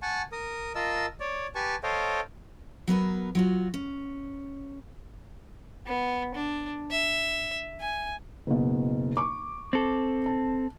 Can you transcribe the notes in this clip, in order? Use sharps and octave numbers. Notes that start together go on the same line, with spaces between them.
F#5 G#5 A5 C#6
A#4 D#6
F4 A#4 D#5 A5 E6
C#5 D5
G4 B4 G#5 A5 C#6
A4 C5 C#5 D#5 F5 G5
F#3 B3 A#4 B4
F#3 F4 F#4
C#4
B3
D4
E5
G#5
F#1 B2
C#6 D6
C4 A4
A5